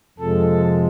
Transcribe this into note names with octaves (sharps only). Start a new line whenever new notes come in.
F2 C3 F3 G#3 A4